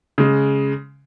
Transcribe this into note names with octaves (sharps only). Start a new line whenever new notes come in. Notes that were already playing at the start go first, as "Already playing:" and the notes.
C#3 G#3